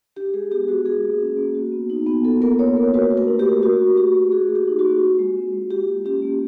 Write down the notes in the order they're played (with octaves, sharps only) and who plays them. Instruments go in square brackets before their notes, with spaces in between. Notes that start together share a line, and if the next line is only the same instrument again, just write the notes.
[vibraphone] D4 G4
G#3 G#4
B3 G4
G#3 F#4
F#4 G#4
A#3
C#4
A#3
F#4
B3
D#4
B3
F4 A4
A#3 A#4
D4 C#5
A#3
F#4 B4
A3
A#4
D4
G4
A3
F#4
A3
D4 G4
A3
F#4 G#4
A#3
G4
D#4
F#4
A#3
F4
G#3
C4
G#3
F4 G4
A#3
C#4 G4
A#3